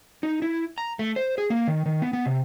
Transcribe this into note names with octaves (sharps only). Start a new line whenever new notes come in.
D#4
E4
A#5
A3
C5
G#4
A#3
D#3
D#3
B3
B3
C3